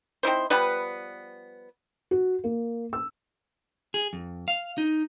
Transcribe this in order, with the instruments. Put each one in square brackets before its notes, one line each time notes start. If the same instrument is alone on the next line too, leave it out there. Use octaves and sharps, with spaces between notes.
[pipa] C4 D#4 E4 C5
F3 G3 B3 B4
[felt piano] F#4
A#3
E6
[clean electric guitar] G#4
F2
F5
D#4